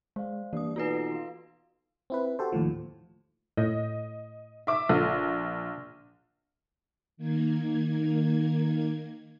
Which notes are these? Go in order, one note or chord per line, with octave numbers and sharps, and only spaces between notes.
G#3 C5 D5 F5
G2 E3 A#3 D5 D#6
B2 D#4 F4 A4 B4 A#5 C7
F5 C6
C4 E4 B4
F#4 G4 A4 C5
D#2 A2 F3
A2 D#5
E5 D6
A#1 A4
D#3 A#3 G#6